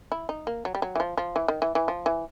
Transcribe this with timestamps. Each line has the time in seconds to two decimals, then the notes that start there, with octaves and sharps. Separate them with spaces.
0.12 E4
0.29 D#4
0.47 A#3
0.65 F#3
0.75 G3
0.82 F#3
0.95 E3
1.00 F3
1.17 F3
1.36 E3
1.48 D#3
1.62 E3
1.75 E3
1.88 F3
2.06 E3